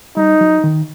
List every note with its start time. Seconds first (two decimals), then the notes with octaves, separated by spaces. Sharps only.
0.16 G3 D#4
0.41 F#3
0.64 D#3